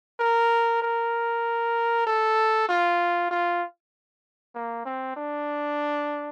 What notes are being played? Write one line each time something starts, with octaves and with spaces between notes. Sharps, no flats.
A#4
A#4
A4
F4
F4
A#3
C4
D4